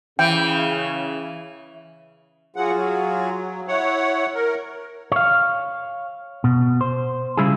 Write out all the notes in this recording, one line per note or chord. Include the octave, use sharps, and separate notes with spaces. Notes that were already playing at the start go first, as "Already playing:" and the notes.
C#3 E3 G5
F#3 F4 F#4 G#4 F#5
F#3
E4 C#5 F#5
A#4
C#5 F5
B2
C5
C#3 F3 G3 E4 F4 G#4